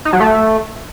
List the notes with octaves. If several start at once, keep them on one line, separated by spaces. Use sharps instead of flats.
D#4
F#3
A3